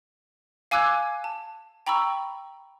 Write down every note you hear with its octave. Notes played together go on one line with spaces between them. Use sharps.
F5 G#5 D6 E6 F#6 G#6
A5
G5 A#5 B5 C#6 E6